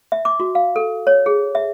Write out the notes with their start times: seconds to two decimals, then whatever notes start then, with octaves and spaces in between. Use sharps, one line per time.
0.12 E5
0.25 D6
0.40 F#4
0.55 F5
0.76 A4
1.07 C#5
1.26 G#4
1.55 E5